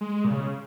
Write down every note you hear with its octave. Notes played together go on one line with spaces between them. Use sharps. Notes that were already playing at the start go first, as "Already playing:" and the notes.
G#3
A#2
C#3